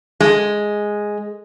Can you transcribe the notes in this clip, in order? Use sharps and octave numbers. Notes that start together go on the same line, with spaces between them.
G#3